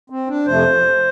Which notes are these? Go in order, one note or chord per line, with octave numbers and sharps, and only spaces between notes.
C4
D4
F2 C3 F3 A3 C5